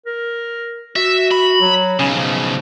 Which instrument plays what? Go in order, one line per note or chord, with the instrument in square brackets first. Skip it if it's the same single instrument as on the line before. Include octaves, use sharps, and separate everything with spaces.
[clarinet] A#4
[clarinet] F#4 [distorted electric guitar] E5
[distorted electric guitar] B5
[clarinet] F#3
[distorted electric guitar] B1 C#3 [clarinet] C#4
[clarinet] F3